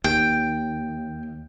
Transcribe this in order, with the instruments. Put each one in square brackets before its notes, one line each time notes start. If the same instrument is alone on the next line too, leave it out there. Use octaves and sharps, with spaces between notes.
[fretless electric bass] D#2 [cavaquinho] G5